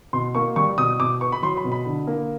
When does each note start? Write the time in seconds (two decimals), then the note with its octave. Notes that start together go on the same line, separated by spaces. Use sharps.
0.13 B2 C6
0.35 A#3 C#6
0.56 G3 C#6
0.78 B2 D#6
0.99 B2 D6
1.21 B3 C#6
1.32 B5
1.42 F#3 C6
1.57 B5
1.64 B2
1.72 B5
1.86 D3
2.07 A#3